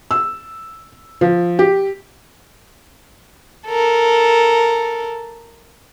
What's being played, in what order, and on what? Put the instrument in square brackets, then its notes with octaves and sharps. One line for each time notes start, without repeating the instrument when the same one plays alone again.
[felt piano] E6
F3
G4
[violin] A4 A#4